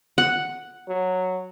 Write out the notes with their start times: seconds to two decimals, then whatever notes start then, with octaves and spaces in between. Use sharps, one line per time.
0.18 F#5
0.88 F#3